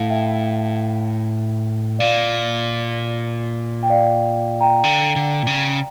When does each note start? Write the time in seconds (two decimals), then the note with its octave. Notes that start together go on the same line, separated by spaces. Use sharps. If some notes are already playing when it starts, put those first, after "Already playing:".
Already playing: A2 F5 A5
0.09 E5 G5
1.99 A#2 D5 F5
3.83 G5
3.90 D5 F5
4.61 G5 A#5
4.84 D3
5.16 D3
5.43 A#2
5.47 C#3